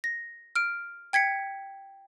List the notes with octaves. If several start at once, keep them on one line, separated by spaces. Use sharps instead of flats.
A#6
F6 D7
G5 G#6 B6 C#7